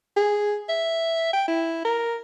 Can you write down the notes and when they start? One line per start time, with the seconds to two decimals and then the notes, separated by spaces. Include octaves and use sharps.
0.17 G#4
0.69 E5
1.34 G5
1.48 E4
1.85 A#4